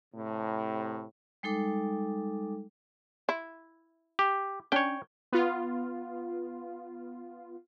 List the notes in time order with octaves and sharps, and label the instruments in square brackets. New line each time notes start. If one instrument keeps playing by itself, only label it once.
[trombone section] A2 C3
[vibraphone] G3 G#3 D#4 A4 G5 D6
[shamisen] E4
[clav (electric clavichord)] G4
[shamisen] C#4 D4 [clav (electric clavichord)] C#5 G5
[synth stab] B3 F4